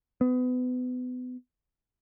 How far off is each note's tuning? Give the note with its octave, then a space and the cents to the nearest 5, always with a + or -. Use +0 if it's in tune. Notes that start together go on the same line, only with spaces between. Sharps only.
B3 +30